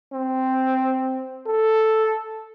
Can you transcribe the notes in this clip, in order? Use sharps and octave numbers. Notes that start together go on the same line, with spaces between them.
C4
A4